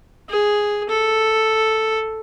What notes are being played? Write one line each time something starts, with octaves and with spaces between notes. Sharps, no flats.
G#4
A4